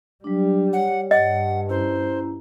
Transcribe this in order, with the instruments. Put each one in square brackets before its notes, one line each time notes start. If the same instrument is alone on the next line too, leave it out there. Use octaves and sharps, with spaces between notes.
[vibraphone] F#3 D4 [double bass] G3
[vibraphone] C#5 [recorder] F#5
[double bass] G2 [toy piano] D#5 [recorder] F#5
[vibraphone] C#4 E4 A#5 [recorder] C5